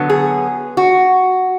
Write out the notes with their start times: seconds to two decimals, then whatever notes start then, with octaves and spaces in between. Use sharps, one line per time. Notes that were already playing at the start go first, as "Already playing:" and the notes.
Already playing: D3 F#3 B3
0.10 G#4
0.77 F#4